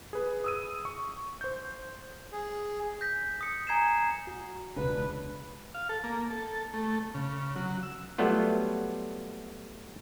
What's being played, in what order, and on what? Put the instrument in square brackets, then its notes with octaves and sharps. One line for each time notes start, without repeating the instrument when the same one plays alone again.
[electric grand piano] G#4 B4
D#6 E6 D#7
C#6
C5 G6
[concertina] G#4
[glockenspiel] G6 A#6 B6
D#6 C#7
G#5 A#5 G#6 C7 C#7 E7
[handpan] F#4
[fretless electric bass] E1 C#2 C#3 [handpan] D4 [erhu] B4
[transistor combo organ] F5
A4
A#3
A4
A3
C#3
F#3
E6
[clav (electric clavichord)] F#3 G3 A3 B3 F4